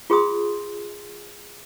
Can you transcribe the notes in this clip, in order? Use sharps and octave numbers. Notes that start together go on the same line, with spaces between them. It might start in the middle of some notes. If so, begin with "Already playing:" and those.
F4 G#4 C6 D#6